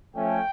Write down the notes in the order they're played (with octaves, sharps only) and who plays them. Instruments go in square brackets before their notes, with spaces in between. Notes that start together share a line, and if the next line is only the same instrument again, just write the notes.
[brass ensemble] F3 A3 C#4 G5